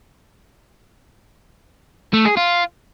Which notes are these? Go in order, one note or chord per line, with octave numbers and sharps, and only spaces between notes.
A3
G#4
F4